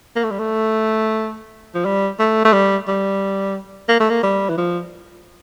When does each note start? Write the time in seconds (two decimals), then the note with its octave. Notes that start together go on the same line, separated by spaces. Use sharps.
0.16 A#3
0.24 A3
0.31 G3
0.39 A3
1.75 F3
1.85 G3
2.19 A3
2.45 A3
2.53 G3
2.88 G3
3.89 A#3
4.00 A3
4.10 A#3
4.23 G3
4.49 E3
4.57 F3